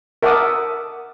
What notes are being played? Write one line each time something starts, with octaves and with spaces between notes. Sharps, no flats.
A#4 E5 F#5 A5 D6 D#6